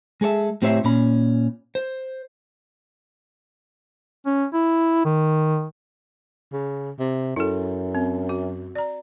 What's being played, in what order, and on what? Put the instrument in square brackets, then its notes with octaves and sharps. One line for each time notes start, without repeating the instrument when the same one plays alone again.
[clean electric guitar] G#3 G#4 A4 C#5 E5
A2 C4 G4 C5 C#5 E5
A#2 C#4 B5
C5
[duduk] C#4
E4
D#3
[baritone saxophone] C#3
C3
[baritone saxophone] F#2 [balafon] E4 A4
[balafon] C4
F#4
D5 A#5